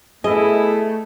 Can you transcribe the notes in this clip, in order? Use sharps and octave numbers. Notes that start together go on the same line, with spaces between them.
A3 B3 E4 G#4 D#5